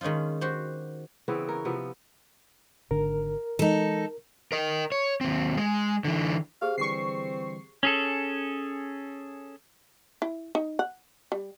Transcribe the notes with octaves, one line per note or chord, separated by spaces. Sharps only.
D#3 G#3 C#4 D#4 F4
F#4 G4 C5
C#3 E3 B3 C4
A#4 C#5
C3 F3 B3
G#1 D3 A#4
E3 G#3 D#4 A4
A#4 D#5
C#5
D#2 C4
G#3
D3 E3
G4 G#4 C5 F5
D3 E3 G3 C4 C#6 C7
C#4 G#4 A4
E4
D#4
F#5
G3